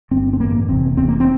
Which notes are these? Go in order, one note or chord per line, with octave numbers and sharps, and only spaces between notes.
G1 G2 D3 C4
C4
A1 G2 D3 A#3
F1 E2 C3 C4
F1 E2 C3 C4
A#3
C4